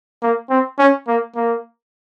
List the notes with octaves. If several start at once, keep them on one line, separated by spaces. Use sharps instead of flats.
A#3
C4
C#4
A#3
A#3